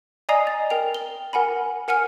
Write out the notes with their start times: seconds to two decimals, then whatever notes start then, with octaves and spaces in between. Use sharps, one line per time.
0.29 D5 D#5 G#5 A#5 D#6 C7
0.47 A6
0.70 A#4 G5 F7
0.94 G7
1.33 A#4 F#5 G#5 B5
1.88 A#4 F#5 G#5 F6 C#7